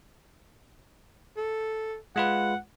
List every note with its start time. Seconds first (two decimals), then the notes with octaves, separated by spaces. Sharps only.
1.36 A4
2.16 G#3 F4 B4 F#5